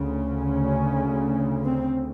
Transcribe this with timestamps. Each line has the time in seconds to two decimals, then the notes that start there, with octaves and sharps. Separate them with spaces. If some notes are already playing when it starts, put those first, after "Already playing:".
Already playing: D2 C#3
0.42 C#4
1.64 C4